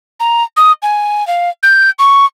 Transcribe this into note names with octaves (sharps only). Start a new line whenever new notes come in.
A#5
D#6
G#5
F5
G6
C#6